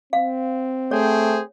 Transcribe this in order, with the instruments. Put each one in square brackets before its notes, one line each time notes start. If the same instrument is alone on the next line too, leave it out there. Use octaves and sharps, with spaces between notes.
[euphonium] C4 [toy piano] F5
[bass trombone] A3 [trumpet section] G#4 C5 G5 [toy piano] C#5